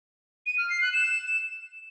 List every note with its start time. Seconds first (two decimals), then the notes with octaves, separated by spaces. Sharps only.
0.46 D#7
0.58 F6
0.70 C7
0.81 F#6
0.93 E7